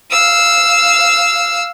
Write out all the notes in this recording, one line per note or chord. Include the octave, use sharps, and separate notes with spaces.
F5 E6